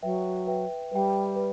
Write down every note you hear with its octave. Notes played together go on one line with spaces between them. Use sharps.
F#3 B4 E5 G5
B4 E5 G5
G3 B4 E5 G5
B4